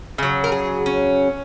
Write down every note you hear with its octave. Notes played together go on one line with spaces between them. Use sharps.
C#3 F#3
A#4
G#4
C#4